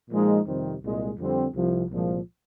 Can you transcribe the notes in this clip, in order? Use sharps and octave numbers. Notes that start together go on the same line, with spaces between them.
A#2 F3 G#3 D#4
F2 C3 D#3 G3 C4
C2 A#2 G#3
F2 D3 G3 C4
C2 C3 F3
C2 A#2 F3 G#3